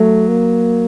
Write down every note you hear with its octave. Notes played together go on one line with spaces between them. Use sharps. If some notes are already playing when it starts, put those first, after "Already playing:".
Already playing: F#3 A3
A#3